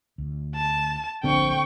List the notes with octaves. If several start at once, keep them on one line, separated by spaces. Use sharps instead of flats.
D2
A5
D1 A#1 A#2 D3 C4 G5 C#6